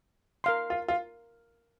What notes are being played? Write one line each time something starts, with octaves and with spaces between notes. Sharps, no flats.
A#4 F5 C6
F4
F4